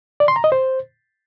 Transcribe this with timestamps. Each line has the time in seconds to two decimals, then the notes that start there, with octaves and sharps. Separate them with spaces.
0.20 D5
0.28 C6
0.36 A#5
0.44 D#5
0.52 C5